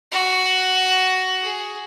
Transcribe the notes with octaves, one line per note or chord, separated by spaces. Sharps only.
F#4
G#4